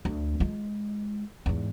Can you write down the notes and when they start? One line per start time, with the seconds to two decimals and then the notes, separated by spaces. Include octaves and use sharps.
0.05 D2
0.40 G#3 F4
1.46 E2 G#2